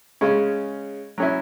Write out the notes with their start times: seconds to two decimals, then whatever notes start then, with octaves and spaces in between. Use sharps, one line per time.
0.21 C#3 G#3 C#4
1.18 F#3 C#4 E4